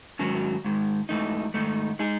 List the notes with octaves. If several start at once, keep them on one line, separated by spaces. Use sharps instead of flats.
G#2 D#3 F#3 C#4 F#4
G#2 D#3 G#3
G#2 E3 A3 D#4
G#2 D#3 A3 D#4
G#3 D#4 G#4